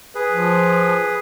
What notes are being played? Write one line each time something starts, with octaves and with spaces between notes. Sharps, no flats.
G#4 B4
F3